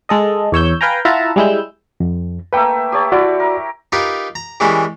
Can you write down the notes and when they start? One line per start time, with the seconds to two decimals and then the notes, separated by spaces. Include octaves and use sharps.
0.09 G#3 A4 D#5
0.52 E2 C#5 E6 G6
0.81 B4 F5 G5 G#5 A#5
1.05 E4 F4 E5 F#5 A5 A#5
1.36 G3 G#3 E4 E6 G6
2.00 F2
2.53 A3 A#3 B4 E5 G5
2.92 G4 C#5 A5
3.12 E4 F#4 D5
3.40 A#4
3.92 D#4 F4 G4 A#4 B4
4.35 A#5
4.60 E3 G3 G#3 C#4 A#4 B5